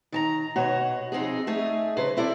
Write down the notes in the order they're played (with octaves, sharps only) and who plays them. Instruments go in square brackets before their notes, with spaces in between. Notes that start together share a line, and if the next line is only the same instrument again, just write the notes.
[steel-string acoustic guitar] D#3 A5 A#5
B2 F#4 C#5
F2 C4 D#4 G#4
A3 D#4 G#4 E5
C#3 F#3 B4 C5
C4 E4 A4 D5